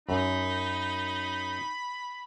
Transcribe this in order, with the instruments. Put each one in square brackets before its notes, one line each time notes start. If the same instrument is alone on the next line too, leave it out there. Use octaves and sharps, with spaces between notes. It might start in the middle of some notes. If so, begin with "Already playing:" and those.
[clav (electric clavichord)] F#2 [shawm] D#4 [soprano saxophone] B5